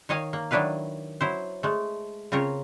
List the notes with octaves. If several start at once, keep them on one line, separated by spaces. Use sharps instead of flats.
D#3 C#5 D#5 F5 G#5
A#3
D#3 F#3 D4 E4 B4 F5
F#3 E4 C5
G#3 A3
C#3 C4 F4 A#4 C#5